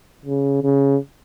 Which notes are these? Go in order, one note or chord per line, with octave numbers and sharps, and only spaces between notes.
C#3
C#3